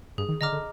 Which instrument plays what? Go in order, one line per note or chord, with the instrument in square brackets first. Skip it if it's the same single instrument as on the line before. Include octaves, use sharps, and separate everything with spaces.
[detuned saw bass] G2 [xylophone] G#4
[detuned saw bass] D#3
[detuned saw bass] D3 [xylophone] D#5 A#5 D6 F6
[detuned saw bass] D3